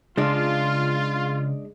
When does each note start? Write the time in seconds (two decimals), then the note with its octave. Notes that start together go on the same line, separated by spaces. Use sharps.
0.17 C#3 G#3 D4 F4